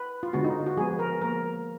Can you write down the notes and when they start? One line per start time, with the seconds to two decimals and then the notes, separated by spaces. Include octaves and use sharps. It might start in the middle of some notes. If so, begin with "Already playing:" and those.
Already playing: B4
0.23 F4
0.33 D3 G#3 B3 F#4
0.44 D#4
0.66 F#4
0.77 F3 G#3 B3 G#4
0.99 A#4
1.21 F3 A#3 A#4